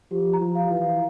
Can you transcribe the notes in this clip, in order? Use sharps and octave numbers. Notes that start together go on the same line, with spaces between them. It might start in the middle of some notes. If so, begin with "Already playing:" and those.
F3 G4
A#5
F3
F5
E3
F5